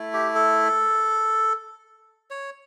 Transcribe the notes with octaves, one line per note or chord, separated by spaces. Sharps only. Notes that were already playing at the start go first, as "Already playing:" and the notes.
Already playing: A3 E4
G4
A4
C#5